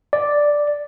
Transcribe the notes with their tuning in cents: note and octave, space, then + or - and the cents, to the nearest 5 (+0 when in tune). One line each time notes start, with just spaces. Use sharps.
D5 +0